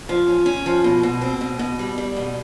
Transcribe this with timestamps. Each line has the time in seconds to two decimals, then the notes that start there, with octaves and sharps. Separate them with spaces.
0.09 F3
0.27 C#4
0.46 C#4
0.66 F3
0.84 B2
1.03 B2
1.21 C4
1.41 B2
1.59 B2
1.79 G3
1.98 G3
2.16 B2